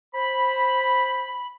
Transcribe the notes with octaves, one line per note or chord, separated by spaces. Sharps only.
C5 B5